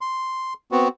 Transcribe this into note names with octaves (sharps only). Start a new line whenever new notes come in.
C6
B3 C4 F#4